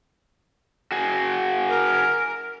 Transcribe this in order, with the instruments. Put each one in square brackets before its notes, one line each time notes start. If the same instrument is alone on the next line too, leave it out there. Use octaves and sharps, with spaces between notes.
[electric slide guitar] F#4 G#4
[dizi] A#4